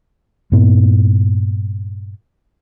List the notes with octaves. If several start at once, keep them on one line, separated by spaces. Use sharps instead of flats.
G2 A#2 B3